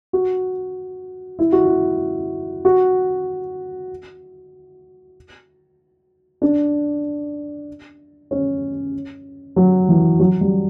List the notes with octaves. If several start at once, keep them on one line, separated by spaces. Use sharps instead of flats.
F#4
E4
F#4
E4
F#4
D4
C#4
F#3
E3
F#3
G3